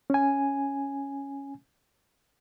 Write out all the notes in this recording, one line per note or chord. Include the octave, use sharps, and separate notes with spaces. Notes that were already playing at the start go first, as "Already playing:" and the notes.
C#4 G#5